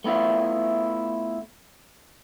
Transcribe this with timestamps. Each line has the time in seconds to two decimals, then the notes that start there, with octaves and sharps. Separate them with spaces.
0.04 A3 B3 E4 F4